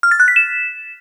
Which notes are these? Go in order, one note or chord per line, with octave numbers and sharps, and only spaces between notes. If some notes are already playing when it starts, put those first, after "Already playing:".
F6
A6
F#6
B6
E7